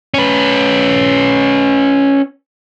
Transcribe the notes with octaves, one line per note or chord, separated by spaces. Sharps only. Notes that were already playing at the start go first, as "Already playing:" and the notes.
C#4 B4